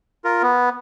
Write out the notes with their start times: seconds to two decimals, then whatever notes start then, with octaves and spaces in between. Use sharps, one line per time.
0.25 F4 A#4
0.43 B3